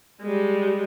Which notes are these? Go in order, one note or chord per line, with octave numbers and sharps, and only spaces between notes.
G3 G#3